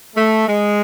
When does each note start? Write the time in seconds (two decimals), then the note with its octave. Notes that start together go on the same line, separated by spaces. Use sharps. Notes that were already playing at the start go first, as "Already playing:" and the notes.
0.16 A3
0.47 G#3